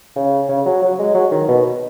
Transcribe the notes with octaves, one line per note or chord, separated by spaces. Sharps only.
C#3
C#3
F#3
F#3
G#3
F#3
D#3
B2